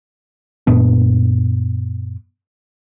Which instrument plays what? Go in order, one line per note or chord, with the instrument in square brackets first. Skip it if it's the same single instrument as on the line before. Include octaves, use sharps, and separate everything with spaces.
[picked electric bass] F#2 A#2 B3 D4